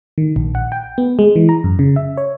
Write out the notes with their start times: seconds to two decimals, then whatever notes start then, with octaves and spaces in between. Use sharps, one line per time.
0.18 D#3
0.36 A#1
0.55 F#5
0.72 G5
0.98 B3
1.19 G#3
1.36 E3
1.49 A#5
1.64 F#2
1.79 C#3
1.96 E5
2.17 C#5